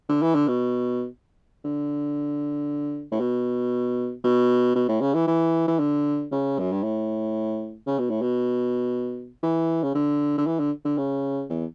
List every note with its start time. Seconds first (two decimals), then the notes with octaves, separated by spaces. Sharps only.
0.09 D3
0.22 E3
0.35 D3
0.48 B2
1.65 D3
3.12 A2
3.20 B2
4.24 B2
4.75 B2
4.88 A2
5.01 C#3
5.14 E3
5.27 E3
5.67 E3
5.79 D3
6.32 C#3
6.59 F#2
6.72 G2
6.83 A2
7.87 C#3
7.99 B2
8.10 A2
8.21 B2
9.43 E3
9.83 C#3
9.95 D3
10.37 D3
10.47 E3
10.60 D3
10.85 D3
10.98 C#3
11.50 E2